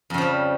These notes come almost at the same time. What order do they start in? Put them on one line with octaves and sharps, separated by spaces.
F2 C#3 F3 G3